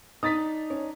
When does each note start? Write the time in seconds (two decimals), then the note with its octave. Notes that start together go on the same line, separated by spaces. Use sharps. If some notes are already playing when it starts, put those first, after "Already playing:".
0.23 D4 D#4 D#6 A6 B6
0.70 C#4